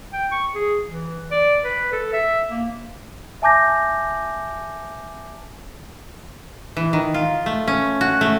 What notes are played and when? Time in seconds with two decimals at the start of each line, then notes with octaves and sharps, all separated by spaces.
0.13 G5
0.32 C#6
0.55 G#4
0.87 E3
1.31 D5
1.64 B4
1.92 A4
2.13 E5
2.50 A#3
3.42 E5 G#5 A5 D6 G6 A#6
6.77 E3
6.93 D#3
7.14 F4
7.46 A3
7.68 C#4
8.01 F#4
8.21 A3